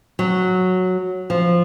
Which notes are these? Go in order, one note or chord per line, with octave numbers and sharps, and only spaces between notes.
F#3
F3